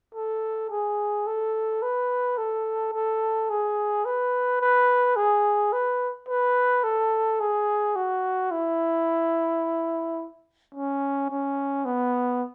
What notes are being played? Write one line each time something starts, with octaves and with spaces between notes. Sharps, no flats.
A4
G#4
A4
B4
A4
A4
G#4
B4
B4
G#4
B4
B4
A4
G#4
F#4
E4
C#4
C#4
B3